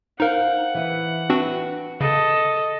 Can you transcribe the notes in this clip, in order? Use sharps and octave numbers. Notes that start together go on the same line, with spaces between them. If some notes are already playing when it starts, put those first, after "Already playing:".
D#4 A#4 C5 F5 F#5
E3 B4
C4 D4 F#4 B4
C#3 A4 D#5